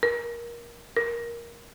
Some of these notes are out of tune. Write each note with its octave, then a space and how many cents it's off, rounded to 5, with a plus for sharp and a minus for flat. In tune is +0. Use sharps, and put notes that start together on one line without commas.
A#4 +25
A#4 +10